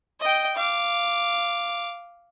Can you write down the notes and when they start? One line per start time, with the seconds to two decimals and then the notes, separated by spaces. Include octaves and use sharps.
0.20 D#5 G5
0.56 F5 D6